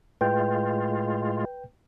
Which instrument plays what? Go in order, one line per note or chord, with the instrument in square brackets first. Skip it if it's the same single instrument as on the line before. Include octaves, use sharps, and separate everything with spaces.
[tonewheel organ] A2 G#3 F4 [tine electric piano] B4 G5 G6